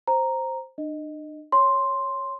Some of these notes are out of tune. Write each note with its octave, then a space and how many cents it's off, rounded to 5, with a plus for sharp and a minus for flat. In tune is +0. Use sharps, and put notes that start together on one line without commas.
C5 +5 A#5 +0
D4 +45 D#5 +0
C#5 +0 C6 +5